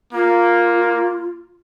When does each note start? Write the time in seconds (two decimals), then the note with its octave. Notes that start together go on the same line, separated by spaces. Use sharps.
0.13 A#3 F4